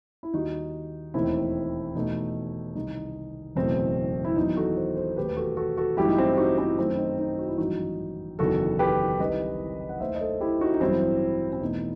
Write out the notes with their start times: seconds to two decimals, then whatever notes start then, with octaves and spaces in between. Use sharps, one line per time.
0.23 E4
0.33 D#2 D#3 G3 D#4 F#4
1.14 E1 D#2 D#3 A3 C4 E4
1.95 E2 B2 A3 D#4
2.75 C2 C3 D#3 D#4
3.55 F#1 E2 B2 A3 C4
4.25 E4
4.36 E2 D#3 F#3 D#4
4.57 F#4 A4
4.77 A4 C5
4.97 A4 C5
5.16 E1 D#2 D#3 A3 G4 B4
5.29 B4
5.37 F#4 A4
5.57 F#4 A4
5.77 F#4 A4
5.97 A1 G2 F#3 A3 E4 G4
6.08 D#4
6.17 C4 E4
6.34 G4
6.37 D#4 F#4
6.58 C4 E4
6.78 F#2 D#3 A3 C4
6.98 D#4
7.19 D#4
7.38 F#4
7.48 E4
7.58 A1 G2 D#3 F#3 D#4 F#4
8.39 F#1 E2 D#3 F#4 A4
8.79 G4 B4
9.20 C2 C3 D#3 G3 B4 D#5
9.89 F#5
10.00 D#2 D#3 A3 C5 E5
10.15 D#5
10.20 A4 C5
10.40 E4 G4
10.61 D#4 F#4
10.74 D#4
10.80 A1 G2 F#3 C4 E4
11.53 C4
11.61 E2 B2 A3 D#4